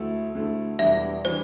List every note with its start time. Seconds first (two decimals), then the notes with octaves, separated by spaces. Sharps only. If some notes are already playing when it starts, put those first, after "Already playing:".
Already playing: D2 A3 E4
0.35 D2 D3 A3 E4
0.79 E1 E2 E3 G3 D4 E5
1.25 E3 G3 D4 C5